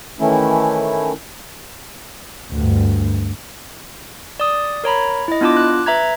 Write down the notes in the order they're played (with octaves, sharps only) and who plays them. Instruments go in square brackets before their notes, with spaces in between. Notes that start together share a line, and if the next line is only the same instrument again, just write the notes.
[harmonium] D#3 E3 A3 C#4 E4
[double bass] D2 G2
[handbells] D5 D#6
A#4 C#5 A#5 B5
E4 D#5
B3 D4 F4 A5 D6
F#6
B4 E5 A#5 G#6